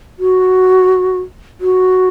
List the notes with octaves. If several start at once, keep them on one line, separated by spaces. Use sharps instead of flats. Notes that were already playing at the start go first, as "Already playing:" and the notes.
F#4
F#4